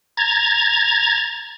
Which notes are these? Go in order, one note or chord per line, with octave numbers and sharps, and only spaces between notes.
A#5 G#6 A6